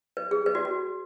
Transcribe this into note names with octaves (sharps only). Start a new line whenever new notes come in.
B4
G#4
B4
F#4
F#4